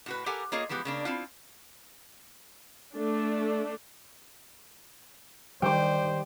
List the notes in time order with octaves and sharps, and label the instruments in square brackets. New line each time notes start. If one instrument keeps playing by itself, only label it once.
[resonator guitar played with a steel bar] A2 F#4 B4
G4 A4 A#4 F#5 G#5
A#3 F4 G#4 C#5 D#5
E3 F3 G#3 B3 G4
C#3 A#3 D4
C4 E4 F4
[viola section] A3 D4
[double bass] D#3 [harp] G3 [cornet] C5 [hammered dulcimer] G5 D6